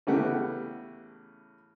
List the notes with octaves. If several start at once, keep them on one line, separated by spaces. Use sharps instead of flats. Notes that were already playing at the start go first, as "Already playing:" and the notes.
A1 C#3 A3 B3 G4 F#5